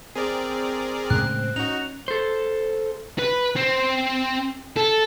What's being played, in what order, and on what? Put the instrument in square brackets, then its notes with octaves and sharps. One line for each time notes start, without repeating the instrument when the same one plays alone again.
[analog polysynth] C4 [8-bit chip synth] G#4 A#4 D5
[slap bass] A2 C#3 G#3 [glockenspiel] F#6
[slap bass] C#4 [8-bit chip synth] D#4 F#4 [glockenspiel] F7
[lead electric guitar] A4 C5
[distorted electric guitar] B4
C4
A4